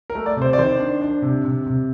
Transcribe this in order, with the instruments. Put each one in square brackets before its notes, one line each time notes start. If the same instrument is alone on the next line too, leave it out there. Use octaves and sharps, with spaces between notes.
[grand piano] A#4
A3
D5
C3
C5
D5
D#3 C5
D4
D4
C3
C3
C3